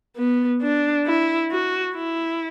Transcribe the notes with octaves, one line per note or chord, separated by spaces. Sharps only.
B3
D4
E4
F#4
E4